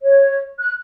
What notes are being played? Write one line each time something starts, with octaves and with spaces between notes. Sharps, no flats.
C#5
F#6